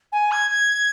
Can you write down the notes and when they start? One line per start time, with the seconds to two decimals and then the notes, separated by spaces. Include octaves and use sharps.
0.12 G#5
0.31 G#6
0.50 G#6